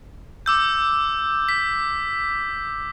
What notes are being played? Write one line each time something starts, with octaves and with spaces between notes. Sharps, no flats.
D6 E6 G6
B6